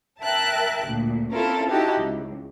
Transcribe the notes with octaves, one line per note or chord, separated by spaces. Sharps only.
A#4 E5 G5 A5 F#6
D2 A#2
C4 C#4 E4 F4 A4 A#4
D#4 E4 F#4 G4 A5
C#2